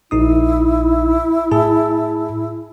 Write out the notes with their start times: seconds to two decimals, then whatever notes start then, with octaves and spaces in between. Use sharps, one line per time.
0.11 A#1 D#4 E4 D#6
1.52 A2 G#4 A5